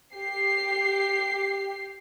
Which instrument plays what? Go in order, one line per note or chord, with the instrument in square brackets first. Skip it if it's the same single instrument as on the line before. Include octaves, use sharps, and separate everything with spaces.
[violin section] G4 C7